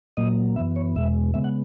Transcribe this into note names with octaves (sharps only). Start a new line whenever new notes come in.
A#2 F#3 A#3 D#5
F#2 E3 B3 E5
C#5
E2 B2 G#3 E5
C#3 G#3 B3 E5
F#5